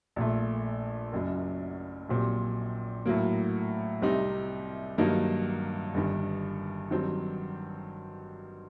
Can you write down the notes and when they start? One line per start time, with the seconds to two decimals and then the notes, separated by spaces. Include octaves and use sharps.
0.16 A#1 A#2 A3
1.12 F#1 F#2 F#3
2.09 A#1 A#2 F#3 C4 G4
3.06 A2 F#3 A#3
4.01 C2 C3 G3 C4 D#4
4.98 G2 D#3 F#3 A#3 D#4
5.94 G1 G2 D#3
6.91 G2 D#3 F#3 C4